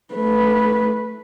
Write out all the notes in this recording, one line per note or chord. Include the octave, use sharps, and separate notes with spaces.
A3 B4